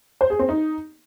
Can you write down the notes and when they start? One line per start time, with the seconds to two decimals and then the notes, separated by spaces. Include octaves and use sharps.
0.21 C5
0.30 G#4
0.39 C4
0.49 D#4